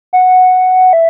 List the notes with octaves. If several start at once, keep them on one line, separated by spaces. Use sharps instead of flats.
F#5
E5